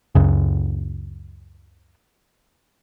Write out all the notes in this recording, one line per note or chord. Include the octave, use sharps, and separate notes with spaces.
C#2 F#2 C#3